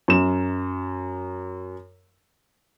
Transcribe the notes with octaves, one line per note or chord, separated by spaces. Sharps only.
F#2 E7